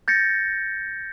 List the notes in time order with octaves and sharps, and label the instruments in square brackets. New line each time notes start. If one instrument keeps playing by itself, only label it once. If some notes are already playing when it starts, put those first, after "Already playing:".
[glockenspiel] G6 A6 A#6 C#7